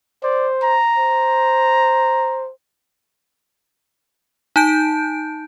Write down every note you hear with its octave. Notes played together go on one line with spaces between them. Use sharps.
C5 D5
A#5
C5
D#4 A5 G6 D7